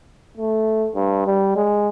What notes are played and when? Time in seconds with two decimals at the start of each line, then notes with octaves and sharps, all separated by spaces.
0.37 A3
0.95 G2
1.26 G3
1.56 G#3